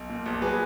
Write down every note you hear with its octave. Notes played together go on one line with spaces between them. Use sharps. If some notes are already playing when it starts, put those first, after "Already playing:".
Already playing: B1
A#2
A#1
F#3 G#4 B4